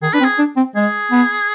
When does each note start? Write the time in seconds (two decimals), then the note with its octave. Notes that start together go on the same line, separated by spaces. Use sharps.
0.02 D#3 G#4
0.13 D4 B4
0.20 C4
0.24 G#4
0.38 D4
0.56 C4
0.75 G#3 G#4
1.11 B3